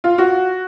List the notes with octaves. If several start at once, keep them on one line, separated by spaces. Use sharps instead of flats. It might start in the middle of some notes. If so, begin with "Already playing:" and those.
F4
F#4